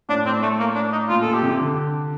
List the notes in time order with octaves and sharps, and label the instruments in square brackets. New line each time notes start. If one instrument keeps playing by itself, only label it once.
[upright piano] A2 [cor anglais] D4
[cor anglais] C4
A3
A#3
D4
D#4
[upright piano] A#2 [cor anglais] F4
[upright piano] A#2 [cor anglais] A4
[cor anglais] G4
[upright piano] C3
D3